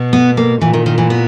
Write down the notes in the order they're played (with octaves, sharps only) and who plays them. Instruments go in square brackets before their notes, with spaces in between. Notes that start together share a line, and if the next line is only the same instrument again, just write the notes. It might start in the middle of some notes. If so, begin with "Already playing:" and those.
Already playing: [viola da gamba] B2
[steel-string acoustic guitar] B3
A#3
[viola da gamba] A#2 [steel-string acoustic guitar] E3
[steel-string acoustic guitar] D#3
D#3
E3
B3